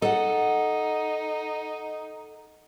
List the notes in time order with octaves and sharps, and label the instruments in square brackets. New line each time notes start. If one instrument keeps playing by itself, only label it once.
[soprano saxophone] D#4 [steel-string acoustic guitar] A4 F#5